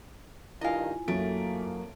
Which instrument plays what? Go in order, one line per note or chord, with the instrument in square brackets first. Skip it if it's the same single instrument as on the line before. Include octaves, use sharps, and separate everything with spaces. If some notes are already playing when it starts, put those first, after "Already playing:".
[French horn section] G2 D#3 [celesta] E4 F4 G#5 [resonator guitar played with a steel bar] D#5 F5
[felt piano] F#2 D7 [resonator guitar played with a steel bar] A3 [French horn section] A#3